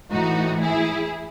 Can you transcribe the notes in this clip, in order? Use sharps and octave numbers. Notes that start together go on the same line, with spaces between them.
A2 E3 D#4 F#4
E4 G#4